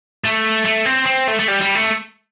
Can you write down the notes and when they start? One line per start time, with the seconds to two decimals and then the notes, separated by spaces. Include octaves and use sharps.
0.24 A3
0.65 A3
0.85 C4
1.06 C4
1.28 A3
1.39 A3
1.48 G3
1.61 G3
1.75 A3